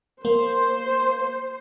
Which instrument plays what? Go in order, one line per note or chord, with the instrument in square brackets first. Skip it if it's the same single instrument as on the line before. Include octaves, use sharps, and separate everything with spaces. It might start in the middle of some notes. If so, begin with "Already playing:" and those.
[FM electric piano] A#3 [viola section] C5